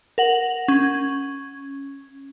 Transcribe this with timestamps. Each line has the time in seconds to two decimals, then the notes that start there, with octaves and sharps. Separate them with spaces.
0.18 A#4 F#5 F#7
0.68 C#4